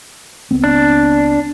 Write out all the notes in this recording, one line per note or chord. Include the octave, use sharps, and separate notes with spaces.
C#2 B3 C4
D4